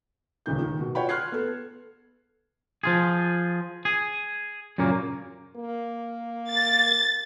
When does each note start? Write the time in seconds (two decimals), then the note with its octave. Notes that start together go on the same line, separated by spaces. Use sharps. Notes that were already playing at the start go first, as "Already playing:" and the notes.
0.46 D#1 C#2 D#3 G6
0.62 D#3
0.80 B2
0.95 F4 C#5 F#5 G5 B5
1.09 C6 F6 F#6 G#6 C7
1.32 B3 A4
2.83 F3 F4 G#4
3.85 G#4
4.78 F#2 A#2 C#3 A#3
5.56 A#3
6.51 A6